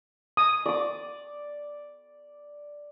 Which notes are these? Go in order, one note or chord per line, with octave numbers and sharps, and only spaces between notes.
D#6
D5 D6